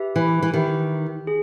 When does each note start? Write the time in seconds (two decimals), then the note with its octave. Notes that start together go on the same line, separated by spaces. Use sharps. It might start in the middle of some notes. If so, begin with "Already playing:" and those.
Already playing: G4 B4 E5
0.16 E3
0.42 E3
0.53 D#3 G4 B4 E5
1.27 G#4